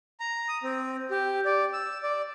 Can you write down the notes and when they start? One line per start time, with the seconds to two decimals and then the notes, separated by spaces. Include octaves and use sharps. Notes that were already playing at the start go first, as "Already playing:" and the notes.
0.20 A#5
0.48 D#6
0.64 C4
1.11 G4
1.45 D5
1.73 E6
2.03 D5